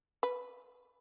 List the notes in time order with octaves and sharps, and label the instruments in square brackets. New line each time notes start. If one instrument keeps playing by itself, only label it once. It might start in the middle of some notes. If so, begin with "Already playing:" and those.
[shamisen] B4